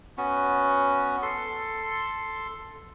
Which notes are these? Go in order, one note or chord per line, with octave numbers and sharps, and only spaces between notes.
B3 C#4 F#4
A4 C6